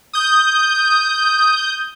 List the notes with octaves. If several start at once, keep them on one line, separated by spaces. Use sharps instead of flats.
D#6 G6